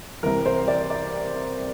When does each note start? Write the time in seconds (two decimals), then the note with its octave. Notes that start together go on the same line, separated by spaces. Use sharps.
0.23 C2 C3 E3 A#4
0.46 C5
0.68 D5
0.90 D5